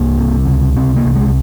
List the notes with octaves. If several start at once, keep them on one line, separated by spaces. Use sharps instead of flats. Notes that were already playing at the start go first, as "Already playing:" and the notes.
Already playing: C2 A#3
C3
C#2
C3 C4
A#3
C2
G#3